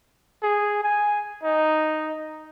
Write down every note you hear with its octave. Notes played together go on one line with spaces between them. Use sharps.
G#4
G#5
D#4